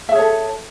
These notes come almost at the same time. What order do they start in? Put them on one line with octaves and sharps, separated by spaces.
E5 G#4 C#5 A4